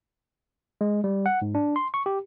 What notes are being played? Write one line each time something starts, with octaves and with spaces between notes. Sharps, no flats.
G#3
G3
F#5
G#2
D4
C6
C#6
G4